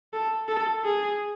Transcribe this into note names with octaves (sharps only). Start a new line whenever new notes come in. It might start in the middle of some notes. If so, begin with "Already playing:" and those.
A4
A4
G#4